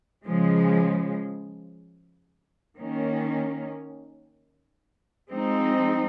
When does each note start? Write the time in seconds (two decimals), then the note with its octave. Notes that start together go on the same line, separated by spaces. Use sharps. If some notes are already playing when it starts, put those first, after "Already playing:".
0.24 C#3 F3 G#3
2.77 D#3 A#3 C#4
5.30 F3 G#3 C4 D#4